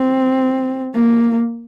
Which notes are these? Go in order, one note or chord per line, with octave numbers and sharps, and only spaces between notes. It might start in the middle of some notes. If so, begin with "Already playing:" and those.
Already playing: C4
A#3